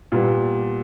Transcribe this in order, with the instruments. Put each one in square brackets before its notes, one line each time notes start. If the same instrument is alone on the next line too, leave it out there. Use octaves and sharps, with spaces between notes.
[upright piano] A#2 G3 B3